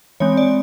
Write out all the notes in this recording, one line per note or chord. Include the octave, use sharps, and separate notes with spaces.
E3 G#3 C4 C#5
D5